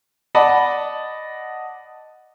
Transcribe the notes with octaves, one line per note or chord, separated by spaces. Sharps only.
D5 D#5 F#5 A5 B5